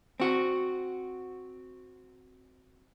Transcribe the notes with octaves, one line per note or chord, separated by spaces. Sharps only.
C4 F#4